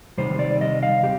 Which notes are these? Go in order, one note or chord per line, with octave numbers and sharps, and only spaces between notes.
C3 D#3 G3 C5
D5
D#5
F5
C3 G4